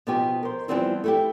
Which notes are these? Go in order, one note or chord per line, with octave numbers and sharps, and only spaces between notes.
B2 F3 B3 D#4 G4 G#5
A#4 C5
E3 F3 G3 B3 C4 E4
A3 E4 G4